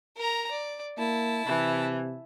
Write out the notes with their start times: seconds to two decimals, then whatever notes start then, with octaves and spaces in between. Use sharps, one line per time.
0.16 A#4 A#5
0.50 D5
0.98 A#3 E4 A5
1.46 C3 E3